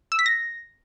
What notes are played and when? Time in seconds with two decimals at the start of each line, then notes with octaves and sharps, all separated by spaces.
0.12 E6
0.19 B6
0.26 A#6